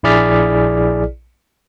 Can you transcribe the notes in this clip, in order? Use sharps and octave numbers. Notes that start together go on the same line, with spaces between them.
A#1 E4 G#4 D5 F6 B6